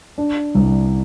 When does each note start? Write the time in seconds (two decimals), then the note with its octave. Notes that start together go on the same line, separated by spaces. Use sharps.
0.18 D4
0.55 C2